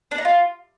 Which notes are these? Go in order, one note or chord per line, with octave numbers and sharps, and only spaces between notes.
D4
D#4
F4